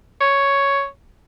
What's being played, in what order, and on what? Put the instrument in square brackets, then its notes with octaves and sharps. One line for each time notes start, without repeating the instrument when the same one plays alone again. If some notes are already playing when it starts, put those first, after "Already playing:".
[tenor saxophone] C#5